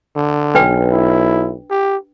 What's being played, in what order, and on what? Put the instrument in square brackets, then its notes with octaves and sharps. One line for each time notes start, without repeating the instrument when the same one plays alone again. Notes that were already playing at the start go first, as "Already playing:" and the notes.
[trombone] D3
[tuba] B1 [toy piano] D4 B4 G5
[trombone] E4
G4